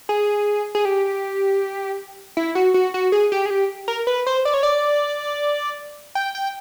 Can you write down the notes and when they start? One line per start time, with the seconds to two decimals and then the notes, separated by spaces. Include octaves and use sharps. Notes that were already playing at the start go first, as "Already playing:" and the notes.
0.09 G#4
0.75 G#4
0.85 G4
2.37 E4
2.55 F#4
2.74 F#4
2.94 F#4
3.12 G#4
3.32 G4
3.46 G#4
3.50 G4
3.88 A#4
4.07 B4
4.27 C5
4.45 D5
4.54 C#5
4.63 D5
6.15 G5
6.35 G5